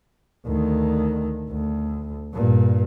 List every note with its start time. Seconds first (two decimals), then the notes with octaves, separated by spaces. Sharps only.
0.46 D2 D#3
1.50 D2
2.34 G2 A#2